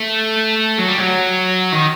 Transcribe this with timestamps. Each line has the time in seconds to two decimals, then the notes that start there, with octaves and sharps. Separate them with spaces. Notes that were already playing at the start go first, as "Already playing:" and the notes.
Already playing: A3
0.78 F#3
0.89 G3
0.98 F#3
1.72 D#3